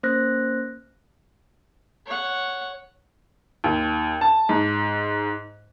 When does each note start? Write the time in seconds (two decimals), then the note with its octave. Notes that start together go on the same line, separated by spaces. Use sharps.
0.03 A#3 C#4 C5 F6 F#6 A#6
2.06 C#5 F#5
3.64 D#2
4.21 A5
4.49 G#2